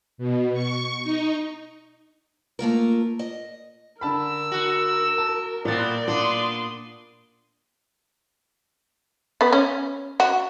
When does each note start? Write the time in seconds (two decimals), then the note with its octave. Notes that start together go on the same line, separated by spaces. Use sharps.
0.18 B2
0.53 C#6
1.04 D#4
2.59 A3 A#3 F4 A#4
3.19 D#5
4.01 D3 A#4 A5 B5 E6
4.52 F#4
5.18 A5
5.65 A#2 B3 C4 D5 A6
6.07 A#2 B3 D4 C6 D#6
9.41 B3 B4
9.53 C#4
10.20 F#4